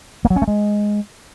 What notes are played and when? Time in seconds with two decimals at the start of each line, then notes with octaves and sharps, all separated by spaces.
0.25 A#3
0.30 F#3
0.36 C#4
0.42 A3
0.48 G#3